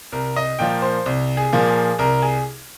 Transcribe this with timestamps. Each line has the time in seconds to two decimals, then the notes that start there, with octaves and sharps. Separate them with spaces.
0.12 C2 A#4
0.36 D#5
0.59 A#2 F3 A#3 G5
0.82 C5
1.06 C2
1.37 G#4
1.53 A#2 F3 A#3
1.68 G#4
1.99 C2 A#4
2.22 G#4